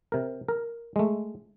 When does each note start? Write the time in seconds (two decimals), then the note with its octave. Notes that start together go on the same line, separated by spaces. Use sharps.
0.12 C3 A#4
0.48 A#4
0.96 G#3 A3